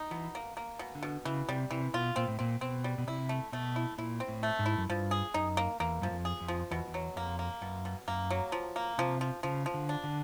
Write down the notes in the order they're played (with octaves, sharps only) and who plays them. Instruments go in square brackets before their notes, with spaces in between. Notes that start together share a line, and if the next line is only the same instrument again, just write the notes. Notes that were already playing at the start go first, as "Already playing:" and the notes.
Already playing: [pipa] D#4
[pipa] B2 [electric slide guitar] E3
[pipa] A#3
A#3
B2
[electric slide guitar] D3
[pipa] B2
[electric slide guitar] C#3 [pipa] E3
[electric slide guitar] C3 [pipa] G3
[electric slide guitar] C3 [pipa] E3
[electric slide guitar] B2 [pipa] F4
[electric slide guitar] A#2 [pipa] C4
[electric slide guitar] A2
[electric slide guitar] A#2 [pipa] C4
[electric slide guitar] B2 [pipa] C4
[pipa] G3
[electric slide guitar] B2
[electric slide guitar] C3 [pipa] E4
[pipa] A3
[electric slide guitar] B2 [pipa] A3
[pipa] E4
[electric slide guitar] A#2 [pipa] E4
[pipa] C4
[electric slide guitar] A2
[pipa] A3
[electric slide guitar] G#2
[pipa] E4
[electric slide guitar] F#2
[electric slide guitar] G2 [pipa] F3
[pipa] G#4
[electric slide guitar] F#2 [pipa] D#4
[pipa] A#3
[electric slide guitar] E2 [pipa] A#3
[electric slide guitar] F#2 [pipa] F3
[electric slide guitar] F2
[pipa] G#4
[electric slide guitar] F2
[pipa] F3
[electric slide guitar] E2 [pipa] B2
[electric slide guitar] E2
[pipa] F#3
[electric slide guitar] F2 [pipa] A#3
[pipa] A#3
[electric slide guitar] F#2 [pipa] B2
[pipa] B2
[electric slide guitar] F#2 [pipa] A#3
[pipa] F#3
F3
A#3
[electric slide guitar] C3 [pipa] F3
[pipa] F3
[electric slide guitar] C#3 [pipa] F3
[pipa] F3
[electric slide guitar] D3
[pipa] D4
[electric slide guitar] D3